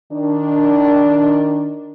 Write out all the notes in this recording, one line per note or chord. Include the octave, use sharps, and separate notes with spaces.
D#3 D4